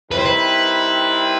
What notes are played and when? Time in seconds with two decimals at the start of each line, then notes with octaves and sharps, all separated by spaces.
0.12 D#3 G3 C4 E4 B4
0.19 C5
0.25 B4